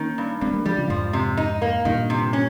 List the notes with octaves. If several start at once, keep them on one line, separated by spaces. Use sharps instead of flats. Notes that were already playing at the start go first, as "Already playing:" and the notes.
Already playing: D#3 A#3 C#4
G2
G2 G#3 C4
G3 A#3
F3 G3 G#3
C#3 F3
F2 G#2 F3
C3
D#4
A#3
G2 A#2 D#3
C3
C#4